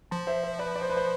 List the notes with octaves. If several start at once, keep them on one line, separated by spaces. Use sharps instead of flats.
F3 A5 C6
C5 E5
C5 E5
B4 D5
D5
C5
B4
C5